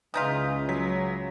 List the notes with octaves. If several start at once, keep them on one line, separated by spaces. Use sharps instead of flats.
C#2 C#3 E3 D#4 F4 D#6 G6 B6
F#3 B6